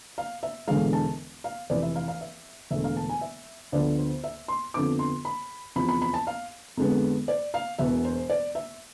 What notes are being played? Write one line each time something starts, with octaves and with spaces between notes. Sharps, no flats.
F5
E5
E1 E2 D3 G#3 F5
A5
F5
F1 F2 E3 D5
E5
F5
F5
E5
E1 E2 D3 A3 E5
F5
A5
G#5
E5
D2 D3 F3 B3 D5
C5
E5
C6
F2 D3 F3 B3 D6
C6
B5
E2 C3 F3 B5
B5
B5
A5
F5
F2 D3 G#3 B3
D5
F5
E1 E2 B2 B3 E5
C5
D5
E5